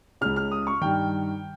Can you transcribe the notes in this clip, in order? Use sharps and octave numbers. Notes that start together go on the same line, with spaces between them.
C#2 C#3 F6
F6
D#6
C#6
G2 D#3 G5